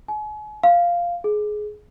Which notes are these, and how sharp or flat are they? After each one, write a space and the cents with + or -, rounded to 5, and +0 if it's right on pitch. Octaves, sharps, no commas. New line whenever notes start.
G#5 +40
F5 -5
G#4 +20